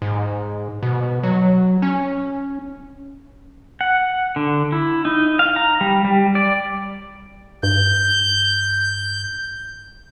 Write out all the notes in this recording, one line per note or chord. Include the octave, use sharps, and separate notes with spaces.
G#2
B2
F#3
C#4
F#5
D3
E4
D#4
F5
A#5
G3
G3
D5
G2 G6